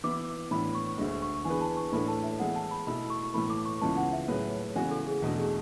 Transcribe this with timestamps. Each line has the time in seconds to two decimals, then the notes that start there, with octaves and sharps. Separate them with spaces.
0.04 E3 B3 E4 D6
0.51 A2 E3 B3 D4 B5
0.75 C#6
0.98 D2 D3 G#3 C#6
1.22 C#6
1.45 E3 B3 D4 G#4 B4 G#5
1.61 A5
1.77 C#6
1.92 A2 E3 A3 D4 A4 B5
2.08 A5
2.24 E5
2.40 E3 G#3 B3 E4 G#4 F#5
2.56 A5
2.71 B5
2.87 B2 A3 E4 B5
3.10 C#6
3.34 A2 E3 A3 B5
3.50 D6
3.65 C#6
3.81 C#2 C#3 E3 G#3 B3 A5
3.97 F#5
4.13 E5
4.28 A2 F#3 C#4 G#4 B4
4.75 C#3 E3 G#3 B3 F#4 G#5
4.91 A4
5.07 G#4
5.22 E2 B2 A3 D4 F#4
5.39 G#4